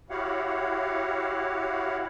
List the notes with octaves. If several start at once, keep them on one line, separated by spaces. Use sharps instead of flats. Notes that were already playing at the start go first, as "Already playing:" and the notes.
E4 F#4 G4 C#5 F5 F#5